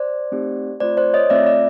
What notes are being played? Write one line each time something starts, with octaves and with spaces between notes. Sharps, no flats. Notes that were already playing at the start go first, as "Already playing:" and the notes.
Already playing: C5 D5
A3 C4 D#4 G4
A3 C4 F4 C5 D5
C5 D5
C#5 D#5
A3 C4 F4 D5 E5
D5 E5